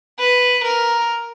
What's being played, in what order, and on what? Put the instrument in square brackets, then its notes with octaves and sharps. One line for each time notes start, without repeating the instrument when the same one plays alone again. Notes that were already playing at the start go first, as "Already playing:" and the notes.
[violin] B4
A#4